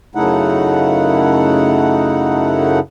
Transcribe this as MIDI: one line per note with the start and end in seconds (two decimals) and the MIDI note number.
0.15 2.80 42
0.15 2.80 49
0.15 2.80 57
0.15 2.80 63
0.15 2.80 64
0.15 2.80 78